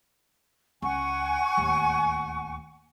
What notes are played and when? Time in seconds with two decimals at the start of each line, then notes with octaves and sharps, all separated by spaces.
0.82 C#2 F#5 G#5 C#6
1.57 D1 D#2